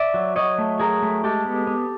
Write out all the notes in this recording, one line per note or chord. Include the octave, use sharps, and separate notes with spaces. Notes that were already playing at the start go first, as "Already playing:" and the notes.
Already playing: D5 E5
F#3
F#3 C#5 D#5
A3
F#3 G#4 A#4
A3
G#3 G4 A4
B3
B3